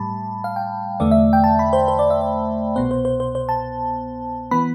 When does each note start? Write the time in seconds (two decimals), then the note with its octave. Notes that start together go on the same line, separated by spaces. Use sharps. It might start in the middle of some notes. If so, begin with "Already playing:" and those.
Already playing: A2 G3 A5 B5
0.44 F5
0.56 G5
1.00 E2 D3 A3 D5
1.11 E5
1.33 G5
1.44 A5
1.59 B5
1.73 C5
1.88 C5
1.99 D5
2.10 E5
2.21 D5
2.76 C2 B2 B3 C5
2.91 C5
3.05 C5
3.20 C5
3.35 C5
3.49 A5
4.51 E3 B3 B5